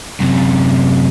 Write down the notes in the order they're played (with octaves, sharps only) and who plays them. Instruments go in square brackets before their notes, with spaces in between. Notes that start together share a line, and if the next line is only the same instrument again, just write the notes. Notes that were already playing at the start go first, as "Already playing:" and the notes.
[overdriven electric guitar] F#2 C3